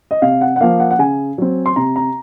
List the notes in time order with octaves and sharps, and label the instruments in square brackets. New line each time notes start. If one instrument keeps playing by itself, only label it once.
[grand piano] D#5
C3 F5
F#5
F#5
F3 A#3 F5
F#5
F#5
C#3 G#5
F#3 C4
C6
C3 A#5
A#5